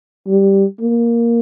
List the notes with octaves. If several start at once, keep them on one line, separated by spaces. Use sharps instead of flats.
G3
A#3